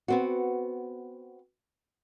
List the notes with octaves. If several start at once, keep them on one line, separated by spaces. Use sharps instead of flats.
B3 C4 F#4